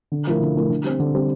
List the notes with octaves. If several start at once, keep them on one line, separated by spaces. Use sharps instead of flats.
D3
F3 A3 E4 A#4
D3
F3 A3 E4 A#4
D3
G3 C4
D3
G3 C4